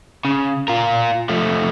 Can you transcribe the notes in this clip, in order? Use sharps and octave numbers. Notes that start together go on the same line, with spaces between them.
C#3
F4 A#4
F3 A3